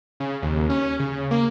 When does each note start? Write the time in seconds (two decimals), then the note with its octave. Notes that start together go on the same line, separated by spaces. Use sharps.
0.20 C#3
0.42 D#2
0.70 C#4
1.00 C#3
1.31 A#3